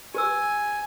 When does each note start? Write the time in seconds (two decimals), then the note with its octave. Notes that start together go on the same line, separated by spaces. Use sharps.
0.14 G4 B4 G#5 E6